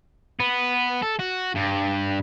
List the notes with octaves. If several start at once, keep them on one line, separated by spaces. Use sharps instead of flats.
B3
A4
F#4
G2